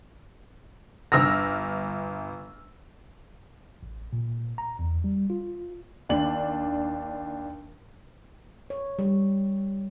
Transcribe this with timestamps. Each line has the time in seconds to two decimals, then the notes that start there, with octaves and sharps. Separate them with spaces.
1.12 G1 E6 F6 A#6
3.83 A1
4.13 A#2
4.58 A#5
4.79 E2
5.04 G3
5.30 F4
6.09 D#2 D4 F#7
8.70 C#5
8.99 G3